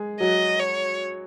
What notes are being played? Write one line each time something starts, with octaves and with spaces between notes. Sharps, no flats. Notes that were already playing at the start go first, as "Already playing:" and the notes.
Already playing: G#3 G#4
F#3 F#4 D#5
C#5